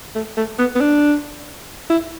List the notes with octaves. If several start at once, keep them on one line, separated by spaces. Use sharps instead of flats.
A3
A3
B3
B3
D4
E4